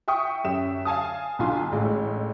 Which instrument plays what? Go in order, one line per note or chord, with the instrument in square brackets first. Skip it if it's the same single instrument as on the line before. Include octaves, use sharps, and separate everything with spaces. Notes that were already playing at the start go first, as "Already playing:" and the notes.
[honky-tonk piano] E5 G5 C#6 D#6
F#2 G4 E5 E7
F5 G#5 A5 D#6
B1 D3 F4 G#5 C6
A1 G#3 A3